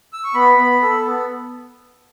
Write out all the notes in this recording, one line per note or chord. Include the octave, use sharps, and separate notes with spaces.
E6
C#6
B3 B5
B3
A4
B3